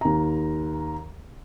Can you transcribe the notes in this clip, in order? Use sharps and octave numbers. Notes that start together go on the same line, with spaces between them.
D#2 A#5